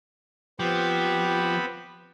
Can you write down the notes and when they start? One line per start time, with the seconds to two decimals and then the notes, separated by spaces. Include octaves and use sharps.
0.60 F3 B3 C4 G4 B5